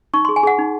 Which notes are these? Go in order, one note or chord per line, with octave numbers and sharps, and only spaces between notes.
D#4 C#6
G#4 C6
G#5
G#4 F#5
D#4